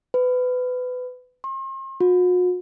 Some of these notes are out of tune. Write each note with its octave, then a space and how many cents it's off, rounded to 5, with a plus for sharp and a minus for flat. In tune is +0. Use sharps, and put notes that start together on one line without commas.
B4 +25
C6 +45
F#4 -45